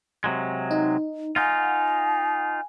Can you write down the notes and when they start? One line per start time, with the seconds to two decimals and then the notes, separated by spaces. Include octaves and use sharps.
0.24 C3 F#3 G#3
0.71 D#4
1.36 D#4 F4 F#5 G#5